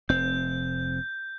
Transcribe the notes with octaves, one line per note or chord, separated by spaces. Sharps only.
F1 C4 G6